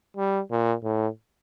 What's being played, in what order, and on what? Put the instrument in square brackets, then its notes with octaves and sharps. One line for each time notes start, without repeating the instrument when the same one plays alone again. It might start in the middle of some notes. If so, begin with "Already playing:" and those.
[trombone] G3
A#2
A2